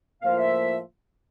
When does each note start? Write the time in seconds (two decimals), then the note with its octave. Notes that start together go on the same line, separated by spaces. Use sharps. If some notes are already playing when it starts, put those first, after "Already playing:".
0.22 A2 F3 A#3 F4 C5 F5
0.37 E5